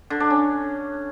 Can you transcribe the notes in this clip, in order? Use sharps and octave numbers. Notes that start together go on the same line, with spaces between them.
D3
D4
C#4